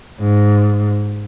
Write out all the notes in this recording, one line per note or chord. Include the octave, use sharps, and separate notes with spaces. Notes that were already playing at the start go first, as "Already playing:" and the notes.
G#2